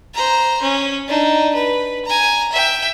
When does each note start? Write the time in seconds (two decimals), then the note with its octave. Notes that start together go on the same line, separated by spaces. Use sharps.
0.14 C5 A#5
0.62 C#4
1.08 D4 D#4
1.54 B4
2.05 G#5 A#5
2.53 E5 G5